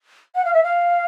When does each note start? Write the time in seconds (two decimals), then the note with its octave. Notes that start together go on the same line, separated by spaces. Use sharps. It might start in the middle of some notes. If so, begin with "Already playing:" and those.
0.35 F#5
0.45 F5
0.54 E5
0.63 F5